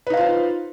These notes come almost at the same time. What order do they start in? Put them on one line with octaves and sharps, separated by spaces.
B4 D#4 F5 F4 C5